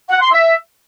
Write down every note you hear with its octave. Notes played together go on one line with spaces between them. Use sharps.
F#5
C6
E5